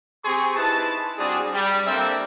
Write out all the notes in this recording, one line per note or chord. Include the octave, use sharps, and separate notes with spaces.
C4 G4 G#4 C6 C#6
D#4 E4 B4 A5
G3 C4 D4 F#4 G#4
G3
G3 A#3 C4 D4 A4 E5